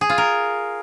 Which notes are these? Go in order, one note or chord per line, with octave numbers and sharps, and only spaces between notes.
G#4
F4
A#4